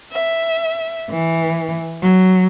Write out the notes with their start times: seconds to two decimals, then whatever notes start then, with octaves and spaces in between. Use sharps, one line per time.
0.12 E5
1.10 E3
2.02 F#3